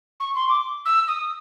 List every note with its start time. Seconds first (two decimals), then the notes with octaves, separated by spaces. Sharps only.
0.20 C#6
0.35 C6
0.49 D6
0.85 E6
1.08 D#6